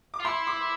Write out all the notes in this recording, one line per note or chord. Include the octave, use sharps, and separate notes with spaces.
D6
F4
E4 C6
D6